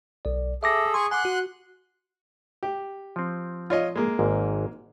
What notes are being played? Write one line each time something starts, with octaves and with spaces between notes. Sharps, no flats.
B1 D5
G#4 A4 E5 D6 A#6
G#4 G#5 C6 C#6
F#5 G#5 C6 D6 F#6
F#4
G4
F3 C4
F4 C#5 D#5
G#3 A#3
G#1 G#2